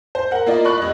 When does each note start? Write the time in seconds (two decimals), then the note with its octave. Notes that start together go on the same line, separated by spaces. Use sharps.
0.15 C5
0.31 A#4 F#5
0.46 A#3 E4 F4 A#4 D5 D#5
0.65 D5 B5 C#6 F#6
0.78 F1 D#5